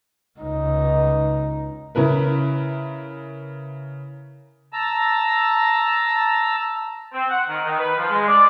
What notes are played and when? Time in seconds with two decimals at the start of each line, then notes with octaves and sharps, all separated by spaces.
0.40 C#2 D#4
1.95 C#3 E4 A#4 B4
4.73 A5 A#5 E6
7.13 C4
7.30 F#5
7.48 D#3
7.64 D#3
7.78 B4
7.97 F3
8.10 G#3
8.28 D5